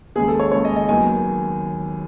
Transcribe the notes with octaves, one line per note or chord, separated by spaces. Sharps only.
D#2 C#3 G#3 G#4
A4
C#5
D#2 C#3 G#3 C#5
D#5
D#5
D#2 D#3 F#3 B3 G#5